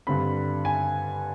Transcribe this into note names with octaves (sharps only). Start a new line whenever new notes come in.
G2 D3 G3 C4 B5
G#5